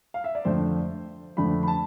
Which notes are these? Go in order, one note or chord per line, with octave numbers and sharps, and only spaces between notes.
F5
E5
D5
F2 D3 A3 D4 C5
F2 D3 A3 D4 B5
B5
A5